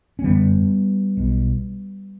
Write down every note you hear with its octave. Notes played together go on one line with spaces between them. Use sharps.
C#4
G1 F#2 D3 G3 B3
B1 B2